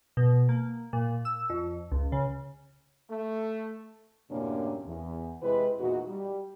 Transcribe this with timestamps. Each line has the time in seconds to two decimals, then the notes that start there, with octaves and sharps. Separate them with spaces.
0.17 B2
0.49 A#3
0.93 A#2
1.25 E6
1.50 F2
1.92 C#2
2.12 C#3
3.09 A3
4.30 F#2 A2 C3 A#3 C#4 D4
4.86 E2
5.42 C3 G#3 E4 B4
5.79 E2 A#2 D#4 F#4
6.08 G3